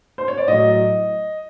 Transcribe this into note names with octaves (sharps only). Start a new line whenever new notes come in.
C5
C#5
D5
A2 F#3 D#5